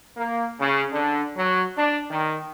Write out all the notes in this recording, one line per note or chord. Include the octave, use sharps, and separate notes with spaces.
A#3
C#3
D3
F#3
D4
D#3